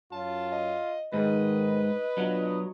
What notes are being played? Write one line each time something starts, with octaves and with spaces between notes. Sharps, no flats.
F#2 F4 C#5 A5
D#5
G#2 D#3 B4 D#5
B2 F#3 D4 F4